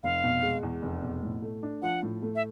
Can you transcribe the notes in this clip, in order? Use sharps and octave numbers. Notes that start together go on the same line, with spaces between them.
F1 F5
B2
G#3
E2
F1
B2
A2
A3
D4
F3 F#5
A2
A3
E5